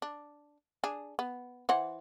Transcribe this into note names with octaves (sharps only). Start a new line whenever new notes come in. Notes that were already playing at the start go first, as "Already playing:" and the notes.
D4
D4 G#4
B3
E3 C5 F#5